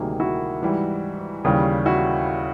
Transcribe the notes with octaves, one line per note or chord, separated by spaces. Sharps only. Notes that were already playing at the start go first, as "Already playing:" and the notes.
Already playing: D2 C3 D#3 G3 A#3 F#4 G#4
E4 F#4
G#2 E3 G3
D#2 C#3 E3 G3
E4 F#4